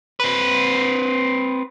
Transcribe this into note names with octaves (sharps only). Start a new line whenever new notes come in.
C4 B4